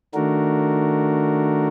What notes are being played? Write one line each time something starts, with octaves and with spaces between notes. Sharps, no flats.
D#3 A3 D4 F#4 A#4